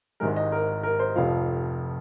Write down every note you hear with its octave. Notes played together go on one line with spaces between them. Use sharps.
G#1 G#2 G#3 A#4
D#5
A#4
A#4
C5
F1 F2 F3 F5